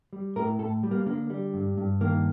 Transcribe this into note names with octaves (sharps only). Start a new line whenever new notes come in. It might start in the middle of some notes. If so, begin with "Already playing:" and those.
G3
A2 A#4
A2 A4
G3
A#3
D3 A#3
G3
G2
G2
D#3 A#3